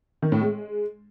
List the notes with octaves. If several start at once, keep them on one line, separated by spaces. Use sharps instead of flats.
D#3
A2
G#3